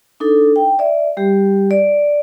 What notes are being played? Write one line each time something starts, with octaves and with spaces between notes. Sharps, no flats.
D4 D#4 A4
G5
D5 E5
G3 G4
D5